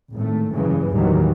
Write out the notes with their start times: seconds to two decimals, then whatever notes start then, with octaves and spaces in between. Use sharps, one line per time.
0.13 G#1 A2 A3
0.51 F#1 G2 C#3 E3
0.93 D#2 A2 D#3 E3 F#3 G3